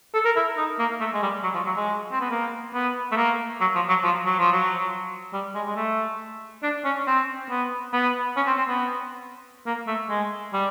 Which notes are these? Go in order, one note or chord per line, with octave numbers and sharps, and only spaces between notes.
A4
A#4
E4
D#4
A#3
A3
G#3
G3
F#3
F3
F#3
G#3
C4
B3
A#3
B3
A3
A#3
F#3
F3
F#3
F3
F#3
F3
F#3
G3
G#3
G#3
A3
D4
C#4
C4
B3
B3
C#4
C4
C4
B3
A#3
A3
G#3
G3